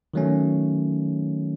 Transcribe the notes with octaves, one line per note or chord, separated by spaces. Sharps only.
D#3 F#3 A3 C#4